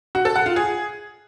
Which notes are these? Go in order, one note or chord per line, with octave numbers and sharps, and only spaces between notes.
F#4
A4
F#5
F4
G#4